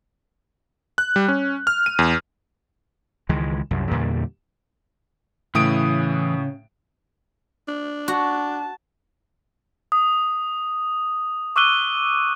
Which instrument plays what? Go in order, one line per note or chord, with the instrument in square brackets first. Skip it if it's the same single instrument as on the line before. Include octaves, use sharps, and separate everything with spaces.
[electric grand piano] F#6
G3
C#4
F6
D#7
E2
[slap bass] C#2 D#3 E3 G#3
C2 F#2
E2 A#2 D3 G3
[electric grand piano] A2 D#6 D7 [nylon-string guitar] C#3 [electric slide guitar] E3
[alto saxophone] D4
[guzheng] F#4 [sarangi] A5
[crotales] D#6
C#6 D6 E6 F#6 D#7 G7